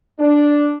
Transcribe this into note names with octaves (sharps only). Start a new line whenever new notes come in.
D4